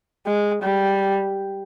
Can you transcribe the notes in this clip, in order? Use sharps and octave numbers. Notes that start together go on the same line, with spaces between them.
G#3
G3